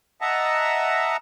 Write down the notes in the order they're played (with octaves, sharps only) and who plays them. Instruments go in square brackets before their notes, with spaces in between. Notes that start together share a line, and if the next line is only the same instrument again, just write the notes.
[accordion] D#5 E5 F#5 A5 A#5